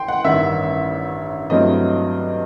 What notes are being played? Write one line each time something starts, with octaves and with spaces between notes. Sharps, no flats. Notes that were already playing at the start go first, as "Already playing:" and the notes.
Already playing: A2 G5 C6
F#5
A1 G2 D#3 E5
G2 F#3 A3 C4 E4 D#5